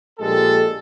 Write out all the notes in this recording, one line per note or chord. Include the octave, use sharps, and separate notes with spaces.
A#1 A#2 G#3 A#3 G4 A4